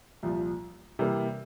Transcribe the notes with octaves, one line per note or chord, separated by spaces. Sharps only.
C2 A#2 F3
C3 E3 G3 A#3